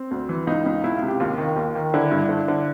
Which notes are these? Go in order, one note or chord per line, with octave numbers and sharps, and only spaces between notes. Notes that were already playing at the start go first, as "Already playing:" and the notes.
Already playing: C4
D2
E3
C#2 D#4
C#2
C#2 E4
F4
C3
G4
D#2 F4
D#3
D#2
D#3
D3 E4
G2
D3
D3